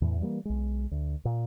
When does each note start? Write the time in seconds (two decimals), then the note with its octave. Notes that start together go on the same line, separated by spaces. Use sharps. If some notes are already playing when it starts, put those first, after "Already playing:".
0.01 E2 A2 E3
0.21 E3 G3 G#3 A#3
0.45 B1 G#3
0.91 D2
1.25 A#2